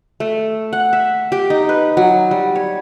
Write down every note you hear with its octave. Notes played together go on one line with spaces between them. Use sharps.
A3
F#5
E5
G4
D#4
B4
F#3
G3
C#5